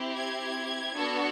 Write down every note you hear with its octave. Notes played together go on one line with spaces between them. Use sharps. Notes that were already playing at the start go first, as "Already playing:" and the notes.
Already playing: C4 E4 G4
G#6
B3 D4 F#4 A4